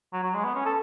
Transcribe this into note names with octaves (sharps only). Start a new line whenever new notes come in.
F#3
F#3
G#3
B3
C#4
A4